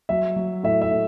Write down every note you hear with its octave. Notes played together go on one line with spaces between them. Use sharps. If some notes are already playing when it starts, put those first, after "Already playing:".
F#3 E5
F#3
A2 E5
E5
A2